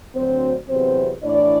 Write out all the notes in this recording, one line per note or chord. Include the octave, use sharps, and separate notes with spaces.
D2 D3 F#3 C4 C5
E2 C3 F#3 C4 C5
A2 E3 D4 D5